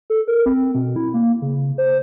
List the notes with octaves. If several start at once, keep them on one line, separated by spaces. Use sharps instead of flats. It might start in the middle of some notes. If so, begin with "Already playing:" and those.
A4
A#4
C4
B2
E4
A#3
C#3
C5